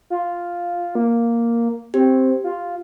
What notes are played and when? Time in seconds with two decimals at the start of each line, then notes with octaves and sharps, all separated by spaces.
0.10 F4
0.95 A#3
1.94 C4 G4
2.44 F4